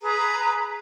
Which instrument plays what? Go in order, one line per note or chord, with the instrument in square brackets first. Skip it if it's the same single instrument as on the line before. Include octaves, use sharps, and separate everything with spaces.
[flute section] G#4 B4 A#5